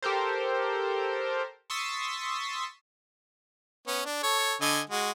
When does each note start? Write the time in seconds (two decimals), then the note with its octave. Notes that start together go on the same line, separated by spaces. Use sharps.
0.02 G4 A4 A#4 C5
1.70 C6 C#6 D#6 E6 A6 B6
3.87 B3 C#4
4.05 D4
4.23 A4 C#5
4.61 D3 D#5 G#5
4.90 G#3 F#4